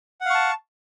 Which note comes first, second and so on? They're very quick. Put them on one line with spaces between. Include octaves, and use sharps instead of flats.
F#5 F5 C#6 A5